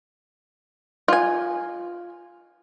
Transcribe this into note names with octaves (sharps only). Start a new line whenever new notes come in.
F4 G#5